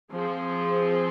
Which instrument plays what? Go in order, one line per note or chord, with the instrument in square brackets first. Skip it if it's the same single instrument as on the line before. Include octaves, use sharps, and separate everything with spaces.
[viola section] F3 C4 G#4